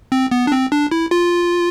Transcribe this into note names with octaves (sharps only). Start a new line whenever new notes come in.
C4
B3
D4
C4
D4
E4
F4